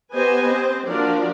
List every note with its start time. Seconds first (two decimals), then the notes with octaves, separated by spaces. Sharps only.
0.12 B3 G4 B4 C5 D#5 G#5
0.50 C4 C5
0.86 F3 A#3 D4 F#4 A#4 D5